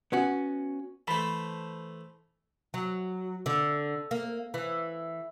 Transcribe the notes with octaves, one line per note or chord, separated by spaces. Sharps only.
B3 C#4 F#4
E3 A3 C5 A5 B5
F#3
D3
A#3
E3